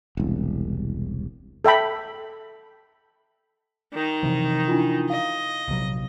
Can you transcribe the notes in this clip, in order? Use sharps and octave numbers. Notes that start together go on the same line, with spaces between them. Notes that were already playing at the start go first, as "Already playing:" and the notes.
E1 C2
A4 E5 G5 B5
D#3 D#4
C3 E3 F3
D4 E4 F4
D#5 F5
A#1 C3 F#3